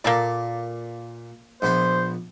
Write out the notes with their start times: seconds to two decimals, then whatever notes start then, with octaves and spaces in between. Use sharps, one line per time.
0.04 A#2 A#3 A4 D5
1.62 A#1 B3 C5 B5